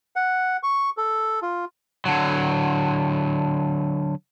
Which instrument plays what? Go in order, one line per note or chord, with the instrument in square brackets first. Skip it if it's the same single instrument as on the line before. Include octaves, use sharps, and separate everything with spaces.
[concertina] F#5
C#6
A4
F4
[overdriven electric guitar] D3 F#3